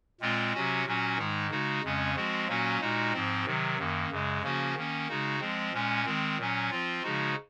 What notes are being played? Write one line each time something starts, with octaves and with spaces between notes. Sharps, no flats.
A#2 G#3 C4 F4
C3 F#3 C#4 F#4
A#2 F#3 C#4 F#4
G#2 D#3 G#3 D#4
C#3 G#3 D#4 F#4
F2 C#3 G#3 C#4
F3 G#3 C4 F#4
A#2 F#3 A#3 C#4 F#4
A#2 G#3 D#4 F#4
G#2 F3 C4
C3 D#3 F#3
F#2 D#3 A#3
F#2 C#3 G#3
C#3 F3 A#3 C#4 F#4
D#3 A#3 C#4
C#3 G#3 D#4 F#4
F3 G#3 C4
A#2 G#3 C#4
D#3 G#3 C4
A#2 F#3 C#4
F3 C4 F4
C#3 F3 G#3 D#4 F#4